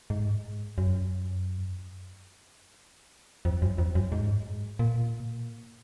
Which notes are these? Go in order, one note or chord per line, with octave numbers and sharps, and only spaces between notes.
G#2
F#2
F2
F#2
F2
F#2
G#2
A#2